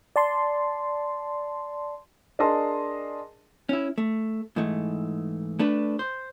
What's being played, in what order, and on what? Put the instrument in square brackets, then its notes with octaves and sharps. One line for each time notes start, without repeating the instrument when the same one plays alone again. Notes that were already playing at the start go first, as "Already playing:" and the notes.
[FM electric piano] D5 A5 C6
[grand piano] D4 G#4 A#4 D#5 A5 C6
[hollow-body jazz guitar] C#4 E4
A3
G#2 E3 A3
A3 D4 B4
C5